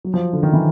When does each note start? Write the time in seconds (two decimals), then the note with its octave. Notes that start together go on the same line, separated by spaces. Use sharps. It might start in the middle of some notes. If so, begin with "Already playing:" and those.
0.05 F#3
0.14 F3
0.33 D3
0.43 D#3
0.53 E3